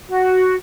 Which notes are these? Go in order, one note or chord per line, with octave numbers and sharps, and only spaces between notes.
F#4